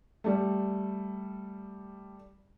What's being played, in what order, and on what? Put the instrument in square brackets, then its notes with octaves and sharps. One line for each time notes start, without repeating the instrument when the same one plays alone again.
[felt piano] G3 A3